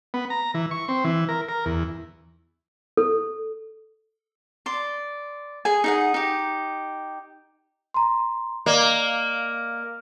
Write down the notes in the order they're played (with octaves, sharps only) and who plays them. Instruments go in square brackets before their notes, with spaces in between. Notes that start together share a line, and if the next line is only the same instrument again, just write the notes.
[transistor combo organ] B3
A#5
E3
C#6
C4
E3
A#4
A#4
E2
[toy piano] A4
[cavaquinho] D5 C6
G#4 G#5
D#4 G#4 F#5
D#4 G4
[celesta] A#5 C6
[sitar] A#3 [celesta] D5 D#5